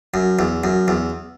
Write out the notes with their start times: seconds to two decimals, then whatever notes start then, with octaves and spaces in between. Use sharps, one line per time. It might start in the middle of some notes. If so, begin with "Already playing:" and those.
0.14 F#2
0.39 E2
0.64 F#2
0.88 E2